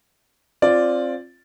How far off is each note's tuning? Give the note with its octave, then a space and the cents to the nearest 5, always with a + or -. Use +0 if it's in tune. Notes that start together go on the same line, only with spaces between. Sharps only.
C4 +25 F4 +0 D5 +0